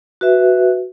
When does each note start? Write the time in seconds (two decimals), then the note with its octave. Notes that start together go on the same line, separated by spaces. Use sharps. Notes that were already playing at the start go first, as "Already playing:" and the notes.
0.21 F#4 B4 E5